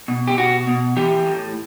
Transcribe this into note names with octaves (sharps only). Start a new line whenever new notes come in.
B2
G4
B2 F#4
B2
E3 G4
A2